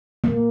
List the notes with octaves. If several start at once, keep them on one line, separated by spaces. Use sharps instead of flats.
A#3